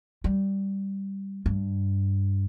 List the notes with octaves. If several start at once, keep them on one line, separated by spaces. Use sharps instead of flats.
G3
G2